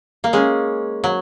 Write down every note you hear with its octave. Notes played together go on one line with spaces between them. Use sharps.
A#3
G#3 C#4
F#3